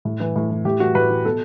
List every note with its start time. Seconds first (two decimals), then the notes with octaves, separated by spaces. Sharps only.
0.05 A2
0.20 E3
0.36 A2
0.51 E3
0.65 A2 G4
0.80 E3 F#4
0.95 A2 B4
1.10 E3
1.25 B2 A4